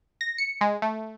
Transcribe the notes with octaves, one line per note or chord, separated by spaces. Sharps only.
A#6
C#7
G#3
A3